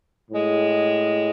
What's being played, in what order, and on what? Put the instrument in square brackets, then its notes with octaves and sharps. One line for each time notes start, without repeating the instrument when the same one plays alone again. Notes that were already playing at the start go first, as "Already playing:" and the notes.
[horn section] A2 G#3